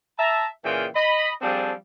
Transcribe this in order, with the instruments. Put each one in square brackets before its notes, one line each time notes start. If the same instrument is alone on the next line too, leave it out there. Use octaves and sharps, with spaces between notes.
[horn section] E5 A5 A#5
A#2 C#3 E3 F4 G#4 G5
D#5 B5
F3 G3 C4 D4 G#4 A4